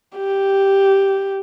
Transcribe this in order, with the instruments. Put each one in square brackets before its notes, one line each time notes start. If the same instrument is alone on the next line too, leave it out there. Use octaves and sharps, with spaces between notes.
[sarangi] G4